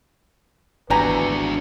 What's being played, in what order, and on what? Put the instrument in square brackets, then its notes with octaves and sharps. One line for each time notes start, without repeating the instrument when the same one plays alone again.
[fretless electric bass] G#1 E2 [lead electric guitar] D4 F#4 [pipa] G4 G#5 A#5 [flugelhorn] B4